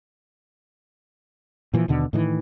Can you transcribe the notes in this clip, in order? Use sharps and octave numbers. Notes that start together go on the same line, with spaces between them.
A#2 E3 F3
D#2 B2 D3
A2 D#3 E3